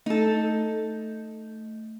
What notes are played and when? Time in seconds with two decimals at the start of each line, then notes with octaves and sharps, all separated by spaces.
0.06 A3 D#4 A4